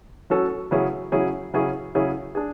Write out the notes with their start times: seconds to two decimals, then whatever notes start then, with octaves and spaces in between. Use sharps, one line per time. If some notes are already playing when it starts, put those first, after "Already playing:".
0.30 F#3 C#4 F#4 A4
0.71 C#3 F#3 C#4 E4 G#4
1.12 C#3 F#3 C#4 E4 G#4
1.54 C#3 F#3 C#4 E4 G#4
1.95 C#3 F#3 C#4 E4 G#4
2.35 D4 G#4